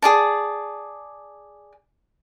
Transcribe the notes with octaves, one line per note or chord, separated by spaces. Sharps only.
G#4 D5 A5